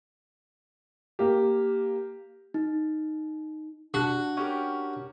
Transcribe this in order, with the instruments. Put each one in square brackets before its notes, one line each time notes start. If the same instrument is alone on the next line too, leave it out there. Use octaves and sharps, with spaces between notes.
[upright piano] A#3 G4
[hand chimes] D#4
[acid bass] D4 [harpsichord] F#4
[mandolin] C#4 G4 A#4